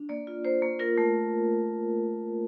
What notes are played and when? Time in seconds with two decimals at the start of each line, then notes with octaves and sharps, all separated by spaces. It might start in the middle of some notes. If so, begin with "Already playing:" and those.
Already playing: D4
0.09 A#3 D5
0.27 F4
0.45 A#3 C5
0.62 A#3
0.80 F4 A#4
0.98 A3